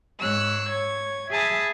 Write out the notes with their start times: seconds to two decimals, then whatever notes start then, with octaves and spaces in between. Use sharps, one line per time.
0.20 G#2 G#3 C#5 E6 F#6
0.68 C#5 G#6
1.31 G#4 E5 G#5 A5 B5 D#6